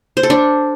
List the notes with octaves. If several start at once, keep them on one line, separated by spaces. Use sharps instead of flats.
C5
A4
D4